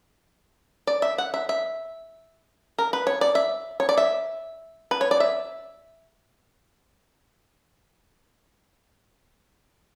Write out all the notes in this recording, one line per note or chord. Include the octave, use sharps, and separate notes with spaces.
D5
E5
F#5
E5
E5
A#4
B4
C#5
D5
E5
C#5
D5
E5
B4
C#5
D5
E5